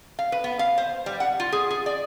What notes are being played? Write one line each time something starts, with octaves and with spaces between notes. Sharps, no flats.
F5
B4
B3
F5
C5
G3
F#5
F4
G#4
G#4
D5